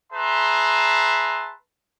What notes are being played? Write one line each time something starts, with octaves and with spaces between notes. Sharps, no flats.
G#4 B4 E5 A5 A#5 C6